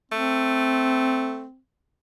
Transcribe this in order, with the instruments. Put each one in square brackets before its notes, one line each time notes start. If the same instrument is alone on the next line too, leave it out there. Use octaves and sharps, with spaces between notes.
[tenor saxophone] A3 [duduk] C4